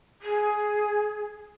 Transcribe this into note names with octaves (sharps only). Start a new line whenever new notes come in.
G#4